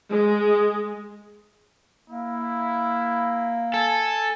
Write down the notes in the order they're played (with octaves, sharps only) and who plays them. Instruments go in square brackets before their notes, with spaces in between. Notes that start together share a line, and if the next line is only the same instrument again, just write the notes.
[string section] G#3
[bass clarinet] A#3 [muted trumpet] E4
[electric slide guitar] A4 [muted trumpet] G#5